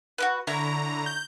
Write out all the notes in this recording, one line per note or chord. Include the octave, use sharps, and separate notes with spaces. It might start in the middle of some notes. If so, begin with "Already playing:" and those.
F#4 G4 B4
D3 E4 C#5 A#5
G6